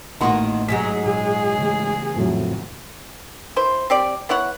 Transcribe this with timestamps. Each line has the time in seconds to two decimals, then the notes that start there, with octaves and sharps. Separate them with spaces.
0.21 A1 A2 D#3 A3 A#3 F#4 C6
0.68 G#2 F#3 G#3 G#4 B6
1.06 A#2 G#4
1.59 C#3 E3 A3
2.15 F2 A2 F#3
3.56 E4 C5
3.90 C4 G4 D5
4.29 B3 E4 C#5 F#5